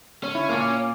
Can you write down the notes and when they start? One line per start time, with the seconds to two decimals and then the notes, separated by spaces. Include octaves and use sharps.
0.24 C#4
0.35 E4
0.49 A#2 A#3